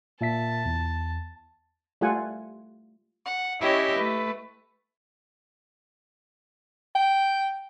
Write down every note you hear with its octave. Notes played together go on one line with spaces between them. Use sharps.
A#2 E5 A5 B6
E2
G3 A3 F4 A4 F#5 G#5
F#5
C#4 E4 G4 C#5 D#5 E5
A3 B4
G5